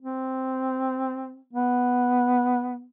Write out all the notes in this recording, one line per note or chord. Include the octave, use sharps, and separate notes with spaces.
C4
B3